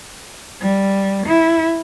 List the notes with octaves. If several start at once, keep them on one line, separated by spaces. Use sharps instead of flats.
G3
E4